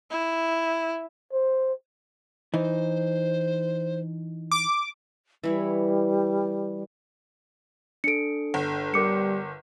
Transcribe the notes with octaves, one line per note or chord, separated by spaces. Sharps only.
E4
C5
E3 D#4 C5
D6
E3 G3 E4 C#5
D4 A4 C#7 D7
G1
G3 A#4 D6 C#7